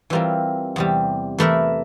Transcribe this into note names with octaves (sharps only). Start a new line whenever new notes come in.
E3 G3 C4 F4 A#4
E2 C3 G3
E3 A3 E4 A#4 E5